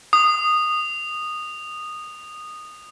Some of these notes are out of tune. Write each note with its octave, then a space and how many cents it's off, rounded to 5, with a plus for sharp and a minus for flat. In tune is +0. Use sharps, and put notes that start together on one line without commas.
D#6 -15